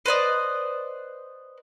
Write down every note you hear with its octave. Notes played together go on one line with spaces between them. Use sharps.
B4 C5 D5 D#5